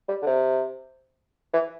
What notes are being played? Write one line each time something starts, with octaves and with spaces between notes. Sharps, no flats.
G3
D3
C3
E3